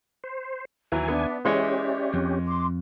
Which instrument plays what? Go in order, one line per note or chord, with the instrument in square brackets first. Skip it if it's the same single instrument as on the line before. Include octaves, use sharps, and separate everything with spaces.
[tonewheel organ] C5
[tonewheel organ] D#2 G#5 [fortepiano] E3 F#3
[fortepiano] B3 [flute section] D4 E5
[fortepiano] E3 G#3 C#5 [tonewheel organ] C#4 G4 [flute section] D5 E5
[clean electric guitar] F2
[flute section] C6 D6